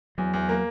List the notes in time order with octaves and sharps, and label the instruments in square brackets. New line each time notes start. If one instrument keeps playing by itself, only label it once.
[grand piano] E2 [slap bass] F#3
[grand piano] E2
A#3